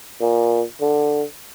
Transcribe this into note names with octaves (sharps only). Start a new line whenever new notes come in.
A#2
D3